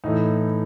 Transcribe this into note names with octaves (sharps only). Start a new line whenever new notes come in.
A2 E3 A3 D#4